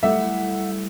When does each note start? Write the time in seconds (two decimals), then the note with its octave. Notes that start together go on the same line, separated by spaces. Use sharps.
0.03 G3 A3 E4 E5 F#5